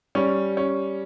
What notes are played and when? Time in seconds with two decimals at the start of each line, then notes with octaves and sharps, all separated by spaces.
0.15 G3 C#4
0.57 C#4